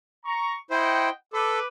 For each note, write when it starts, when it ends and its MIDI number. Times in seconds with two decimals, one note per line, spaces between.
0.25 0.54 82
0.25 0.54 85
0.71 1.10 64
0.71 1.10 72
0.71 1.09 75
0.71 1.09 78
0.71 1.09 79
1.33 1.59 69
1.33 1.66 71
1.33 1.66 86